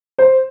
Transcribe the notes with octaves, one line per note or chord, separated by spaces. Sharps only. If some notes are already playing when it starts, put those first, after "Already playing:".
C5